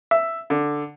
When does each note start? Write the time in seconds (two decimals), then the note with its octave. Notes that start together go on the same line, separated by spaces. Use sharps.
0.11 E5
0.50 D3